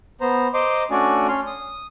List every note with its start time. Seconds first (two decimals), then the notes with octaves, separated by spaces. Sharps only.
0.21 B3 C5 A#5
0.54 C5 D#5 A#5 C6 D6
0.91 A3 C#4 D4 F#4 D5 G#5
1.28 C#4 C6 F6
1.47 D#6